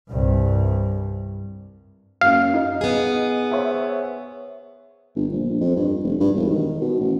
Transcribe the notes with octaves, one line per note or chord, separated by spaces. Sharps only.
C2 G2
F#2 A#3 C#4 F5
D#4
B3 G#4
C5 C#5 E5
G1
A#1
F2
G2
F1
G2
E1
D#3
B2
A1